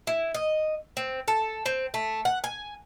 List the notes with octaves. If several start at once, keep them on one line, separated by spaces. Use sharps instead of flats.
E4
D#5
C4
A4
C4
A3
F#5
G#5